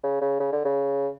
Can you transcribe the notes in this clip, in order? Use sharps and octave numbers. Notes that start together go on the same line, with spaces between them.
C#3
C#3
C#3
D3
C#3